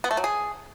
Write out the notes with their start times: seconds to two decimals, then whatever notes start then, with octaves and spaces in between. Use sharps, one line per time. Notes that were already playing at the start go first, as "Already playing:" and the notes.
0.04 B3
0.11 A3
0.17 F#3
0.24 G#4